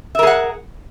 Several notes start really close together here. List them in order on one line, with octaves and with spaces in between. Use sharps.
E5 A#4 G#4 F#5